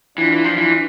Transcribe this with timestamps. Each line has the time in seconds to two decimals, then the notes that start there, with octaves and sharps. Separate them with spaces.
0.18 E3 D4 F4
0.32 E3
0.44 F3
0.58 E3